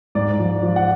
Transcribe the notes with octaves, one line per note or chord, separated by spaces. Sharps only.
G#2 D5
F3
F3
F#5